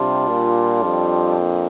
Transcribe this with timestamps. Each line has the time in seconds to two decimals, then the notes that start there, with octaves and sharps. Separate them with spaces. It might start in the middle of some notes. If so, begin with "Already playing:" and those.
Already playing: C3 G3 D4 F4
0.29 A#2
0.83 F2
1.37 A#3 D4